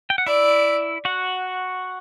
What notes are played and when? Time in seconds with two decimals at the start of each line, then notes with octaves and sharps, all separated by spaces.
0.10 G5
0.18 F#5
0.26 E4 D5 E5
1.05 F#4 F#5